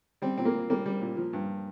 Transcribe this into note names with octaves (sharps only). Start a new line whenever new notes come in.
G3 C4
A#2 C4
A#3
A#2
G3 A#3
G3
A#2
F3
G2